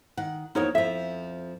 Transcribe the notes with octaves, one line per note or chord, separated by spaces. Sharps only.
D#3 F#5
E2 F3 A#3 D#4 A#4 C#5
F2 F3 E5